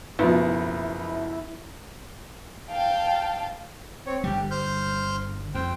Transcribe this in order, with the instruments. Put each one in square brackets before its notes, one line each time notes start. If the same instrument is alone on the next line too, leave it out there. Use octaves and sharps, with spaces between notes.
[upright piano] F#1 B2 [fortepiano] F3 B3 [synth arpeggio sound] E4
[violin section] F5 G5 A5
[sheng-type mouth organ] C4 C#5
[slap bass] G1 D3 G3 [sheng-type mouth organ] G4
[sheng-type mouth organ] C5 F6 G6
[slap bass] F2 [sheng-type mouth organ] C5 G5